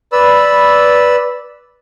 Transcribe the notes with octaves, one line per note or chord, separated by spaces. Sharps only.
B4 D5 B5 E6